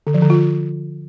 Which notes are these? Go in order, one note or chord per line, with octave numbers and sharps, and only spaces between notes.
D3
F3
D3
F4